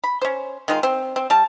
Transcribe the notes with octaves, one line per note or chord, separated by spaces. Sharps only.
B5
C#4 C5
D#3 G#3 F4
C4
C4
G3 A5